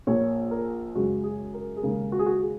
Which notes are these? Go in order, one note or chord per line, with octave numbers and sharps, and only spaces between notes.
A#1 A#2 A#3 C#5
A#4
F#2 C#3 G#3 F#4
G#4
A#4
G#4
D#2 C#3 G#3 A#4
F#4
G#4
F#4
G#4